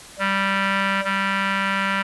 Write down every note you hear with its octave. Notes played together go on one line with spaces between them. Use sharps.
G3
G3